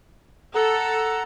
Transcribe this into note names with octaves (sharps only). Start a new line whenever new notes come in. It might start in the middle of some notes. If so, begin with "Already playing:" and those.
A4 F#5 A#5